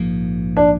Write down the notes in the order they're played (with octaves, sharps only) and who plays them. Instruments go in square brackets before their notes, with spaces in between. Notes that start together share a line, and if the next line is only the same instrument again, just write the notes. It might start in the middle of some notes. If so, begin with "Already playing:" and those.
Already playing: [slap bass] A#1 G#2 F3 A#3
[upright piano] D4